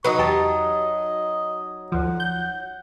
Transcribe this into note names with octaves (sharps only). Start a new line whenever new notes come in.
F#3 D#4 B4 D#5 C#6
E2 G4 D#5 A5
D2 F3 F#5
G6